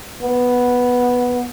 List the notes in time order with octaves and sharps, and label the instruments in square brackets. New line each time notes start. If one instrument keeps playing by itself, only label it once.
[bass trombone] B3